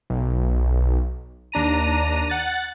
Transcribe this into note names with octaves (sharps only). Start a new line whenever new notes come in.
B1
D#2 D4 A#5 D#7
F#5 A6